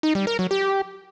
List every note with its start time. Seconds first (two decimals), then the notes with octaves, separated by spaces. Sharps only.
0.03 D#4
0.15 G3
0.27 A#4
0.39 F#3
0.51 G4